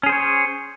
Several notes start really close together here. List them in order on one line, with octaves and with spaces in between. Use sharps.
C#4 G#4 C5 C#5